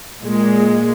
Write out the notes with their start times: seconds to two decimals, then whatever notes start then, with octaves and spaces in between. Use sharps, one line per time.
0.24 A#2 G#3